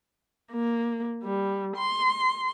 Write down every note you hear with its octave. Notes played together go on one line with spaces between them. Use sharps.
A#3
G3
C6